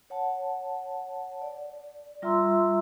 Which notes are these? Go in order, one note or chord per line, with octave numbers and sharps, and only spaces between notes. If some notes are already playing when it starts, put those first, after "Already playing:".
C#5 F#5 A5
D5
G3 F4 E5 A#5 C6 E6